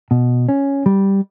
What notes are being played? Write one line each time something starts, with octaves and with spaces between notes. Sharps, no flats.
B2
C#4
G3